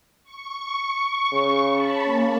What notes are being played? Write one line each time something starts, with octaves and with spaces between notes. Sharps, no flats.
C#6
C#3
A5 B5
A#3 C#4